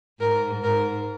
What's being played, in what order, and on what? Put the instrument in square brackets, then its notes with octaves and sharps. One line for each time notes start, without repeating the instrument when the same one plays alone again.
[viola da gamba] G#2 [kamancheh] A#4
[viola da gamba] G#2 [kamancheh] A#4